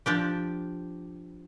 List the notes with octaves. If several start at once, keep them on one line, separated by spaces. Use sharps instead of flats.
F3 D4 G4